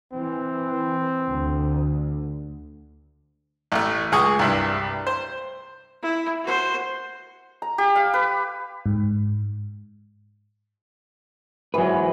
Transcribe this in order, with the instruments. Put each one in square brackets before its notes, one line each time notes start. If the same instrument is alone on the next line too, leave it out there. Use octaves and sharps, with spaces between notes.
[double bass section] E3 [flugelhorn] C4
[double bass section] D2 D3
[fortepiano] A1 A3
C#2 G#4 C#6 D#6
C2 G2 E5
C5
[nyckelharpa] E4
F#4 C5
[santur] A#5
G4
F5
B4
[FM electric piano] G#2
[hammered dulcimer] G#2 E3 [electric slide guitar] F#3 B4